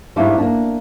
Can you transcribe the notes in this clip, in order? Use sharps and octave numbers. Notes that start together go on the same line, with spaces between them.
G#2 G3 A3 D4 E4 F5
A#3 D4